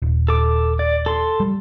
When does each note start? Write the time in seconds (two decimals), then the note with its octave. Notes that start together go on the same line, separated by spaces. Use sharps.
0.02 D#1
0.28 A4 D6
0.79 D5
1.06 A4 C6
1.40 G3